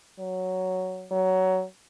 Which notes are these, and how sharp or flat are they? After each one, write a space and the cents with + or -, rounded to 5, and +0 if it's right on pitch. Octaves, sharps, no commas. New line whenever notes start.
F#3 +5
F#3 +15